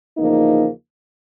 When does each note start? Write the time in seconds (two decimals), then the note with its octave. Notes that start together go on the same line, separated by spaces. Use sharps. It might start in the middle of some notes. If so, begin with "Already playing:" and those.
0.18 E2 C#3 F3 A#3 D#4